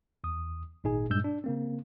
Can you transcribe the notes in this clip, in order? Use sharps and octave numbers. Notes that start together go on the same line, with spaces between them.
E2 D#6
G#1 A#2 D#4 G#4 G#5
G2 A#2 G#3 E6 G6
D4
C#3 A#3 C4